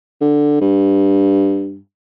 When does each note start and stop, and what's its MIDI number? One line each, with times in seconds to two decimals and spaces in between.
0.21 0.59 50
0.61 1.77 43